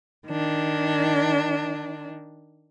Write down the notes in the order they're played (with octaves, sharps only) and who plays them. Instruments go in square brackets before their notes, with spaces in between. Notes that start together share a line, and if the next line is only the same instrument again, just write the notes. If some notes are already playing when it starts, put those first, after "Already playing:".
[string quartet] D#3 D4